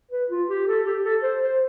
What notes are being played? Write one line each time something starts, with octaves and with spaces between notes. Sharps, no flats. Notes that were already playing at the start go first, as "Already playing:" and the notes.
B4
F4
G4
A4
G4
A4
C5
C5